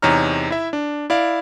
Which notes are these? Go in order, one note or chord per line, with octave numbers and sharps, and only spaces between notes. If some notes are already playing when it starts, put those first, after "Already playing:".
E2 C3 D#4 C#5 A#5 F6
E4 E5
D4
E4 D5 F5